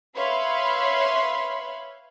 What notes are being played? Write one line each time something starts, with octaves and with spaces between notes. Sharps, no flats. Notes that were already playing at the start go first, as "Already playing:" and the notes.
B4 C#5 E5 F5 B5 C6